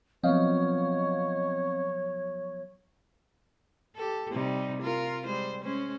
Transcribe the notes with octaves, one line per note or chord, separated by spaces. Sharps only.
F3 F#3 B3 C4 C#5 D#5 F5
G4 A4
C3 G3 D#4
F4 A#4
G3 G#3 C5
G#3 C#4 C5